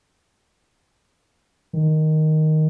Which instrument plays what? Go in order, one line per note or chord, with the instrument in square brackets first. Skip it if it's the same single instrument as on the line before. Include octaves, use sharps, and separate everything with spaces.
[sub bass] D#3